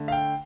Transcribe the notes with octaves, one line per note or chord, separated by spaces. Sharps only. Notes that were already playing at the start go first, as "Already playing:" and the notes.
Already playing: D3 A3
F5
G5